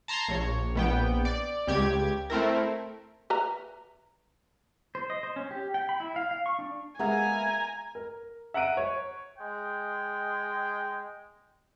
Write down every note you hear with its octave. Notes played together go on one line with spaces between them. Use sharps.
A5 A#5 C6 G#6 C7
A#1 C#5
A#1 B3 G5
D5
C#2 G4 G#6
A3 C4 E4 A#4
B4 E5 A#5
C5
D#5
C5
C#4
G4
G5
B5
E4
F5
F5
C#6
D4
G#3 A#3 B3 E5 G#5 A#5 G#6
A#4
E5 F#5 A#5 F#6 D7 D#7
C#5
G#3 G5